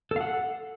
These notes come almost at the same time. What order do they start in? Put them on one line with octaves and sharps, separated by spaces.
A4 F5 F#5